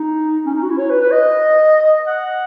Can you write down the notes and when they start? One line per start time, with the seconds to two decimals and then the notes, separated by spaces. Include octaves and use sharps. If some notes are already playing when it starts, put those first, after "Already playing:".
Already playing: D#4
0.46 C#4
0.55 D#4
0.63 F#4
0.70 E4
0.78 C#5
0.90 B4
1.01 B4
1.11 D#5
2.07 F#5